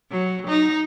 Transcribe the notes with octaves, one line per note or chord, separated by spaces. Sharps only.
F#3
D#4